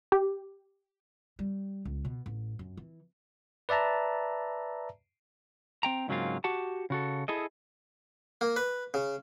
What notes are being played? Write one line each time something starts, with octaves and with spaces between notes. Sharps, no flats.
G4
G3
C#2
B2
A1
F#2
E3
B4 D5 E5 A5 A#5
C4 G5 A#5
G#2 C#3 F#3 A#3 C4 F4
F#4 G4 F#5 A5
C#3 F#4 A4
E4 G#4 A4 D#5
A#3
B4
C#3